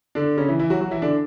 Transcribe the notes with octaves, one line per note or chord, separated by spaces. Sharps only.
D3 D4
C#3 C#4
E3 E4
E3 E4
F#3 F#4
F#3 F#4
E3 E4
D3 D4